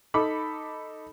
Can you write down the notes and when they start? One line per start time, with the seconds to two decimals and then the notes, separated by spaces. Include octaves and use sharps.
0.14 D#4 A4 B5 D6